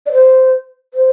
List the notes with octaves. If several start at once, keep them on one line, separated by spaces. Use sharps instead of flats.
D5
C5
C5